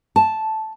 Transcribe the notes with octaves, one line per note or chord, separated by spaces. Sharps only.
A5